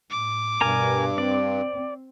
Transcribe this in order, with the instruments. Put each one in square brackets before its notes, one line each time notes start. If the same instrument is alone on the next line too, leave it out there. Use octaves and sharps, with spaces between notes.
[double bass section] A2 [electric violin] D6
[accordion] G2 [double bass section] B2 [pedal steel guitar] A#4 G#5 A#5
[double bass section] C4 [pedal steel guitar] D5